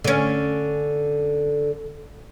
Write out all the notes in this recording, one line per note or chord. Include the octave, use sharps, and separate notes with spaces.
D3 C#4